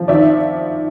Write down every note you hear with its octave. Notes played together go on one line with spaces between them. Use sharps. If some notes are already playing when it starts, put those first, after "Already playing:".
Already playing: F3
D#3 D5 E5